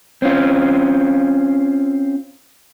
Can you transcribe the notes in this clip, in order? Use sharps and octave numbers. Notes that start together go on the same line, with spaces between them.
C4 C#4 F4